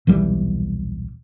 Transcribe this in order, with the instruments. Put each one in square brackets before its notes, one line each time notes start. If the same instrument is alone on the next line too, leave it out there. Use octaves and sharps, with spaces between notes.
[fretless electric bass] D#1 B1 E3 G3